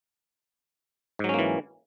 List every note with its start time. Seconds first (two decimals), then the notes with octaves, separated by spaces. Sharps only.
1.19 G#2
1.24 F#3
1.29 C#4
1.34 A#3
1.39 E3